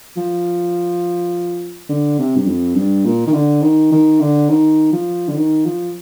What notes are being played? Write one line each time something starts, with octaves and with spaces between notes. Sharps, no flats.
F3
D3
C3
G2
F2
G2
A#2
D#3
D3
D#3
D#3
D3
D#3
F3
D3
D#3
F3